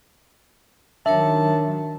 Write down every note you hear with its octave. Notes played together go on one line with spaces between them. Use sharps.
D#3 F#3 D4 A#4 C#5 E5 A5